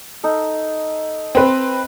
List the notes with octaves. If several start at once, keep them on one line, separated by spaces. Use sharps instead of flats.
D#4 A4
C4 B4 B5 C6